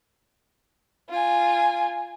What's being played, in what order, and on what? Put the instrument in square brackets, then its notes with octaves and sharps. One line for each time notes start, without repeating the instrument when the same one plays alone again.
[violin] F4 G#5